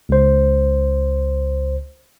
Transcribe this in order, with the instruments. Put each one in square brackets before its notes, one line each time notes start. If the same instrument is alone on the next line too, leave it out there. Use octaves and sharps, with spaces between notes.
[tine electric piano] C#2 C5